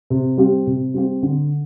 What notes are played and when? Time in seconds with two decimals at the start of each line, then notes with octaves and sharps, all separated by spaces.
0.10 C3
0.37 G3 C4 G4
0.67 C3
0.94 G3 C4 G4
1.22 D3